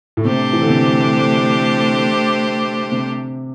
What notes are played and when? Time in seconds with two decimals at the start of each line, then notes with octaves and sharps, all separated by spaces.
0.17 A2
0.25 C3 A3 D4 G4 C5
0.53 E3
0.62 D3
0.69 C3
2.92 C3